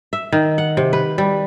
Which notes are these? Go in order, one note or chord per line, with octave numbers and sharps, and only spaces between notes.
E5
D#3
F#5
C3
B4
G3